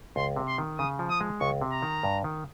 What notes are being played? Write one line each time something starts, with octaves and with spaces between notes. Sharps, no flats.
C#2 C6
C3
C6
D#3
C#3 D#6
F3
D#6
G#3
C#2 C#6
C3
A#5
D#3
G2
D#3